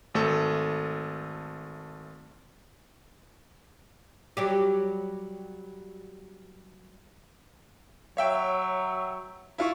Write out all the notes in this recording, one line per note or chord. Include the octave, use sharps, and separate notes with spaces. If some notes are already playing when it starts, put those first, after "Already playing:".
G#1 A3 A4
F#3 G3 G4
F#3 C#5 E5 G5
E4 F4 C#6